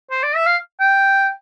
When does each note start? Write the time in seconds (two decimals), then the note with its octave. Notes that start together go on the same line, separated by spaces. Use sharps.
0.11 C5
0.23 D5
0.35 E5
0.46 F5
0.80 G5